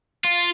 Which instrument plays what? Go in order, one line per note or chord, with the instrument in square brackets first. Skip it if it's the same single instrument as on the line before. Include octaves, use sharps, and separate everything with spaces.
[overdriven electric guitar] F4